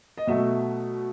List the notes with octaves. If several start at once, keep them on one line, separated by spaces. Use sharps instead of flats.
D#5
B2 F#3 A3 E5